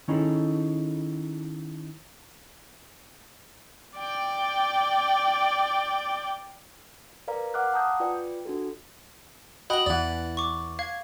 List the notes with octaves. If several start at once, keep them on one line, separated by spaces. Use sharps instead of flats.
D#3 C#4 D#4 E4 G#4 A4
D5 G5
A#4 B4 D5 F5 A#5
F5 F#5 D6 F6 F#6
F#5 A5 A#5 D#6 G6
F4 B4 D5 G5
D4 F#4 A4
F#4 D#5 G5 B5 F#7
E2 E3 D5 F#5
C#6 D6
F5 G#6